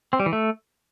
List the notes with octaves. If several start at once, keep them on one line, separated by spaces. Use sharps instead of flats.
C4
G3
E3
A3